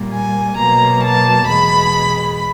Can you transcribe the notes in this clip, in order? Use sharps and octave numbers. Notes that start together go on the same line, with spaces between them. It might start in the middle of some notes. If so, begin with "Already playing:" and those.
Already playing: A#2 G3 A#3
G#5
B2 F#3 A#3 A#5
A5
E2 B2 G#3 B5